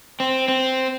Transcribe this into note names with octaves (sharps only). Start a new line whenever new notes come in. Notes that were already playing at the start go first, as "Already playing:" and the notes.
C4
C4